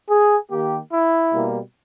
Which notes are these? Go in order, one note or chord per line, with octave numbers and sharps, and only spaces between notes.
G#4
D#3 A#3 G4
E4
B2 G3 A#3